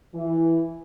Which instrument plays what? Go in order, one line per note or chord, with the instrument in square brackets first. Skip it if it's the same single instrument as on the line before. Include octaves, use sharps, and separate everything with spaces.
[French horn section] E3